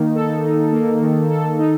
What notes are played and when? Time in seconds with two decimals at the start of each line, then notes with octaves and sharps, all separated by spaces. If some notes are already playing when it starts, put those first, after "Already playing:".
Already playing: D#3 A#3 D#4
0.15 A4
0.45 D#4
0.73 A#3
1.02 D#3
1.30 A4
1.59 D#4